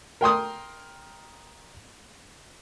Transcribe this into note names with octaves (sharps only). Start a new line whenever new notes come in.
A#4 G5 C6 D#6